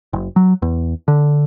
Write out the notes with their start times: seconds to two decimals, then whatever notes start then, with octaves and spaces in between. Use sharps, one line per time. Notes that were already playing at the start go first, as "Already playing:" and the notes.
0.13 F#1
0.36 F#3
0.62 E2
1.08 D3